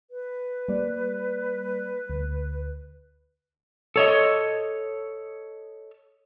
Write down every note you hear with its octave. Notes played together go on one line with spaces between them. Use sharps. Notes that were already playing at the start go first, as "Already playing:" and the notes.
B4
G3 A#3 D5
D2
A4 C#5 D#5